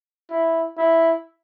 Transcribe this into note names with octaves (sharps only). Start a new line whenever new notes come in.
E4
E4